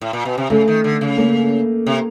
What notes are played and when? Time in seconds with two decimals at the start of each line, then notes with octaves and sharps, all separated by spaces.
0.01 A2
0.13 A#2
0.25 B2
0.38 C3
0.50 C#3 A3
0.68 D#3
0.84 D3
1.01 C#3
1.18 A#3
1.86 C3